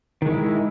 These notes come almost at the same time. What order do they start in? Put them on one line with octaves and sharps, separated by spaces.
D#3 G#3 E4